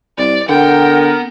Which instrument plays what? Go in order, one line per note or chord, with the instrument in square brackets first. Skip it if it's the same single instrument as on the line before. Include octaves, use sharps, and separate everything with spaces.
[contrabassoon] C2 [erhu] D5
[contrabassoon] D3 [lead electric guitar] B3 F#5 [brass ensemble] A#4 [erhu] G5